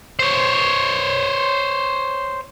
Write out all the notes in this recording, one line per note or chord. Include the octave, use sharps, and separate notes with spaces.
C5 C#5